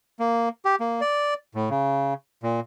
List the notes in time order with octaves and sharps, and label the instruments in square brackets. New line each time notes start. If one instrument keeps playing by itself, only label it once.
[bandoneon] A#3
G4
A#3
D5
A2
C#3
A#2